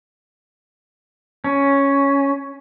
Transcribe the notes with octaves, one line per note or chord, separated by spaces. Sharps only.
C#4